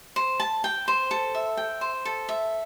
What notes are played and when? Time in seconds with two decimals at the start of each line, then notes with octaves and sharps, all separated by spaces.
0.16 C5
0.40 A5
0.64 G5
0.88 C5
1.11 A4
1.35 E5
1.57 G5
1.81 C5
2.05 A4
2.29 E5